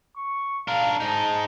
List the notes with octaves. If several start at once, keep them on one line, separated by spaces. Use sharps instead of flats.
C#6
D4 A#4 F5
G#2 D#4 A5